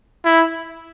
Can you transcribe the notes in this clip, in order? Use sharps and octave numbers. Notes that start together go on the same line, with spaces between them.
E4